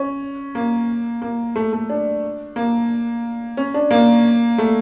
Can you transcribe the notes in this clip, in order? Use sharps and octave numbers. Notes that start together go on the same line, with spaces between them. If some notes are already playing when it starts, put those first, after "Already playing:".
Already playing: C#4
A#3
A#3
A3
A3
D4
A#3
C#4
D4
A#3
A3